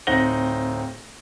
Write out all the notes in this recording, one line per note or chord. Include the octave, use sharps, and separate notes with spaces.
D1 C4 D#4 F#5 A#6 G7